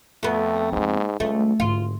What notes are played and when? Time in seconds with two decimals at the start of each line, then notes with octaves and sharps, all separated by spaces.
0.23 F2 A3 B3
0.72 G#2 G#3 A#3
1.20 C#2 G3 A3
1.60 F#1 G#2 D3 F4